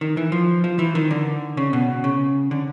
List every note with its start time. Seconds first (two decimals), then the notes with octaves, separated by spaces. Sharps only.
0.01 D#3
0.17 E3
0.32 F3
0.64 F3
0.79 E3
0.95 D#3
1.11 D3
1.57 C#3
1.73 B2
2.04 C#3
2.51 D3